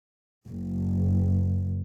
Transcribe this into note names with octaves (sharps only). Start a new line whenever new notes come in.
F#1